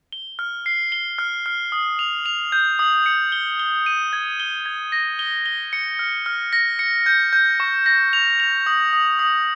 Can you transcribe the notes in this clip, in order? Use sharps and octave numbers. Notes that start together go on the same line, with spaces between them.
G7
F6
C7
G7
F6
F6
D#6
F7
F7
G6
D#6
C#7
G7
G7
D#7
G#6
G7
G#6
A#6
G7
G7
C#7
F6
F6
A#6
C#7
G6
G6
C#6
A#6
F7
F7
D#6
D#6
D#6